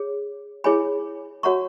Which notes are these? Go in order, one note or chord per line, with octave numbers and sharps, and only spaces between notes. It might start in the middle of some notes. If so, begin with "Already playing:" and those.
Already playing: G#4 C#5
E4 G#4 C#5 G#5 B5
F#4 C#5 F#5 A#5 C#6